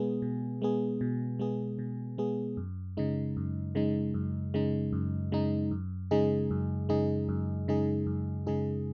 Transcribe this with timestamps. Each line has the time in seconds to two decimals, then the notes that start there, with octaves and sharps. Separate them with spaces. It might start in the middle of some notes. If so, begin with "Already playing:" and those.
Already playing: B2 G#3 B3 G#4
0.22 B2
0.62 G#3 B3 G#4
1.01 B2
1.39 G#3 B3 G#4
1.79 B2
2.18 G#3 B3 G#4
2.57 F#2
2.97 C#3 G#3 D#4
3.37 F#2
3.75 C#3 G#3 D#4
4.14 F#2
4.54 C#3 G#3 D#4
4.93 F#2
5.32 C#3 G#3 D#4
5.71 F#2
6.11 C#3 G#3 D#4 G#4
6.51 F#2
6.89 C#3 G#3 D#4 G#4
7.29 F#2
7.68 C#3 G#3 D#4 G#4
8.06 F#2
8.47 C#3 G#3 D#4 G#4